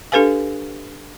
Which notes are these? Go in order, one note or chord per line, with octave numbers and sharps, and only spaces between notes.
D4 G4 A4 B4 F5 G#5